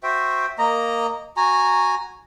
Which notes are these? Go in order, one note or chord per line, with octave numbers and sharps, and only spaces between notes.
F#4 C5 E5 G5
A#3 D#5 A#5
F#4 G#5 A#5